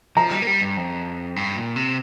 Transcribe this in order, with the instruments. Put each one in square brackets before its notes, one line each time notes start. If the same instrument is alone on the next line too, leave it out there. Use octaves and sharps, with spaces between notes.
[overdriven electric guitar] F3 [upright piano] A#5
[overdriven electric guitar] G3
A#3
G3
G2
F2
G2
A#2
C3